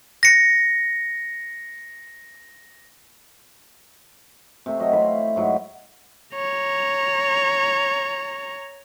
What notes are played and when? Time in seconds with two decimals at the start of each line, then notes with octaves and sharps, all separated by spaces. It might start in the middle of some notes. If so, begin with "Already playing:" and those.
0.23 A#6 C#7
4.66 C3 A3
4.80 F#3 D#5
4.93 E4 F5 B5 C6
5.36 G#2 F#3
6.35 C#5 A#5